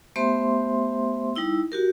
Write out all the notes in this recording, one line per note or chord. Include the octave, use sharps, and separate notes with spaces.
A3 B3 G4 C5 E5 C6
G3 D#4 E4 E6
F#4 G4 A#4